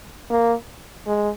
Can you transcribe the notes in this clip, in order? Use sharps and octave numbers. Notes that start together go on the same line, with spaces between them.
A#3
G#3